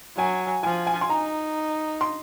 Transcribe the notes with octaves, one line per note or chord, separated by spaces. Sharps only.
F#3 G#5
F3 G#5
G#5
C6
D#4 A#5
C6